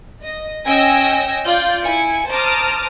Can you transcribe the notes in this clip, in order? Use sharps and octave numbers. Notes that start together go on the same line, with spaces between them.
D#5
C#4 D#5 G5 G#5 E6 A#6
F4 D5 G6
E4 G#5 C#7
C5 A5 A#5 D6 D#6 F6